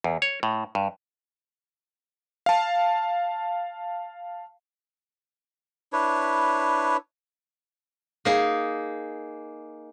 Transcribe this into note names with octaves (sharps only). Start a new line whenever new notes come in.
E2
C#5
A2
G2
F5 A5
D4 E4 B4 C#5
A#3 D#4 G#4